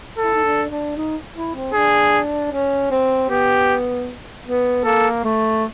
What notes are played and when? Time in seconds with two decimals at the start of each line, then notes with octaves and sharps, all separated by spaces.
0.18 A4
0.23 E4
0.34 D#4
0.44 D4
0.70 D4
0.96 D#4
1.35 E4
1.55 C4
1.74 D4 G#4
2.52 C#4
2.91 C4
3.29 B3 G4
4.46 B3
4.84 A#3 A4
5.24 A3